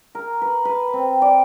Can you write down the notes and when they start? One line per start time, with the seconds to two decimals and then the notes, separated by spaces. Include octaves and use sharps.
0.15 A#4
0.42 B4
0.65 B4
0.93 C4
1.22 D5